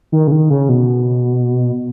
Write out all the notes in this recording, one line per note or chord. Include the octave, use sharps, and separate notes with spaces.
D#3
C#3
D#3
C#3
B2